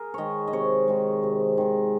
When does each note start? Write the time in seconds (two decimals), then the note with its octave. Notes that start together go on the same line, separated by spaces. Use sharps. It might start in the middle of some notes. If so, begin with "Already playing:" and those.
Already playing: G#4 A#4
0.14 D#3 G#3 C#5 D#5
0.47 D#5
0.53 C3 C#5
0.88 D#3 G#3
1.23 C3
1.58 D#3 G#3